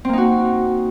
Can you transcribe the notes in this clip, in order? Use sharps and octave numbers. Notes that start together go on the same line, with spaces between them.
A#3 C4 D#4 F#4